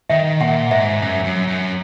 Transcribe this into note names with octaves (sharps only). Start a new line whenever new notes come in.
D#3 E5
A#2 F#5
G#2 E5
F#2
F#2
F#2